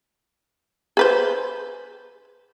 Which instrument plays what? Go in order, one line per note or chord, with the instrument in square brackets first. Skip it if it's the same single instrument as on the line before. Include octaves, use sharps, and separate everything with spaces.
[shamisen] G#4 B4 C5